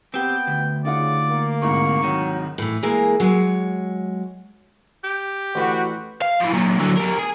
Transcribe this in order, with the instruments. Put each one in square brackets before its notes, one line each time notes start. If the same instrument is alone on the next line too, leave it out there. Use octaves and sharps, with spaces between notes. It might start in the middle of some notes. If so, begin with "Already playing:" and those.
[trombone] B3 [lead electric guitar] C4 G4 [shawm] G5
[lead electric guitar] D2
[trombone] C#3 [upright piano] D#4 F4 F#5 [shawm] D5
[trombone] A#3
[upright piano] C2 G#2 [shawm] C#6
[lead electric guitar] D#3 [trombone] F#3
[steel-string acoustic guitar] A2 E3
E3 G#3 A#3 G#4 A#4
F#3 G#3 C#5
[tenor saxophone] G4
[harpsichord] A1 B4 [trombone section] F#4
[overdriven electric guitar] F5
E3 F3
A#2 F#3
D3 F#3
G4 A#4
G#4